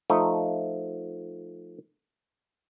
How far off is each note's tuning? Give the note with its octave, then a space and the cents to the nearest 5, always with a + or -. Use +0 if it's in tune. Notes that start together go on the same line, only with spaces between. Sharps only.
F3 +0 A3 +0 D#4 -5